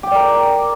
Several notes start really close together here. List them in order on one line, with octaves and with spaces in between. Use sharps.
G4 G5 D5 A#4